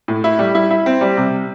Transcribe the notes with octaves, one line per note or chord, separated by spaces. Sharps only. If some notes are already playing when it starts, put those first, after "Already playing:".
A2
E4
G3
E4
E4
C4
G3
C3